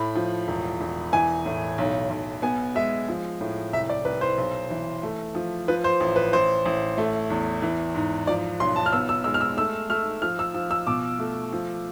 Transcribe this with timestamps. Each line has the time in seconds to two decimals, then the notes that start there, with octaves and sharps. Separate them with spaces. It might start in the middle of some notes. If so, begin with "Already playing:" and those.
Already playing: A2 B5
0.15 F3
0.48 E1
0.81 E1
1.13 E3 G#5
1.46 A2
1.78 B1
2.10 B1
2.42 B3 G#5
2.75 G#3 E5
3.08 F3
3.41 A2
3.73 C2 E5
3.90 D5
4.05 C2 B4
4.21 C5
4.38 B1
4.70 E3
5.03 A3
5.35 F3
5.68 F3 B4
5.84 C5
6.00 A1
6.16 B4
6.33 A1 C5
6.66 A1
6.98 A3
7.30 E2
7.62 E3
7.94 G#2
8.27 F3 D5
8.60 B1 C6
8.76 A5
8.86 F6
8.92 B3 E6
9.09 E6
9.24 G#3 E6
9.34 F6
9.41 E6
9.57 A3 E6
9.90 A3 F6
10.22 F3 F6
10.39 E6
10.54 F3
10.71 E6
10.87 B2 D6
11.19 A3
11.52 F3